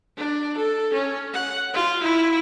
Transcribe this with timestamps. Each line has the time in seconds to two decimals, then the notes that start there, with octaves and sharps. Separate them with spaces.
0.18 D4
0.57 A4
0.93 C#4
1.34 F#5
1.74 F4
2.03 E4